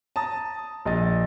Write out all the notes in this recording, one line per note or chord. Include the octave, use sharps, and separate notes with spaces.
A5 A#5 D#6 A6
A#1 D#5 A6